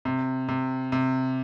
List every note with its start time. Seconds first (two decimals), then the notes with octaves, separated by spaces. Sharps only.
0.05 C3
0.48 C3
0.92 C3